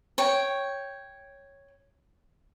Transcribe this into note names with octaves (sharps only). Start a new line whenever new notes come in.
C#5 G5